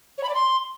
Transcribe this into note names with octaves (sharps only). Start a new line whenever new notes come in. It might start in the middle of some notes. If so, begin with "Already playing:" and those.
C#5
B5
D5
C6